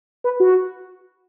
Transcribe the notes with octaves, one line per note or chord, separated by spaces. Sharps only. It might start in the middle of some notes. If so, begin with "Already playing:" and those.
B4
F#4